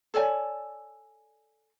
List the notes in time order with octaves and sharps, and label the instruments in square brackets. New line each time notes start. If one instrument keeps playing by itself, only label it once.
[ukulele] A4 C#5 D5 G#5